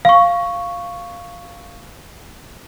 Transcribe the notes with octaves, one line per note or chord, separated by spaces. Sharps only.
F5 C#6